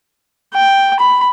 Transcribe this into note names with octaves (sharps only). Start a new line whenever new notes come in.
G5
B5